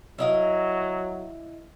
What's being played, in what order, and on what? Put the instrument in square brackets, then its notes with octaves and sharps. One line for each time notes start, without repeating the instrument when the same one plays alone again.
[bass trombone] F#3 [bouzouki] E4 D#5 F5